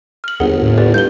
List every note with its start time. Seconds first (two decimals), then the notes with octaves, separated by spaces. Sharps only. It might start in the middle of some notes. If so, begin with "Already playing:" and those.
0.24 F6 F#7
0.40 G1 D#2 G#4 A#4 F#5
0.62 A2
0.77 G4 B4 D5
0.94 G2 G6 G7